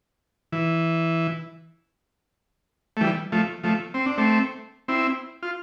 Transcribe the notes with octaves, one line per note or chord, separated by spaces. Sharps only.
E3
A3
E3 G3
F3 A3
F3 A3
C4
D4
A3 C4
C4 E4
F4